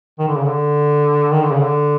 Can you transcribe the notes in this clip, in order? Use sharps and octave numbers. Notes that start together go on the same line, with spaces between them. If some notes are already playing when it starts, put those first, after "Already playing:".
D#3
D3
C#3
D3
D#3
D3
C#3
D3